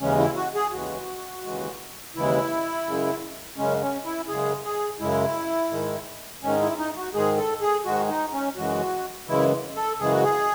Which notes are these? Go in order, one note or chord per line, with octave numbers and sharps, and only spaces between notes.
D#2 C#3 E3 G#3 C#4
E4
F#4
G#4
D#2 C#3 E3 G#3 F#4
D#2 C#3 E3 G#3
D#2 C#3 E3 G#3 E4
F#2 C#3 G#3
F#2 C#3 G#3 C#4
C#4
E4
F#2 C#3 G#3 G#4
G#4
F#2 C#3 G#3 E4
G#2 D#3 G#3
G#2 D#3 G#3 C#4
E4
D#4
F#4
G#2 D#3 G#3 G#4
A4
G#4
G#2 D#3 G#3 F#4
D#4
C#4
F#2 C#3 E3 G#3 F#4
F#2 C#3 E3 G#3 E4
A4
F#2 C#3 E3 G#3 G#4
F#4
G#4